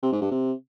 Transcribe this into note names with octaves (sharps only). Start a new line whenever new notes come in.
C3
G#2
G2
C3